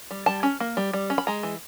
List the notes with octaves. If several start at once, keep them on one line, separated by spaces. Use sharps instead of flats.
G3
G3 A5
C#4
A#3
G3
G3
C#4
B5
G#3 A#5
E3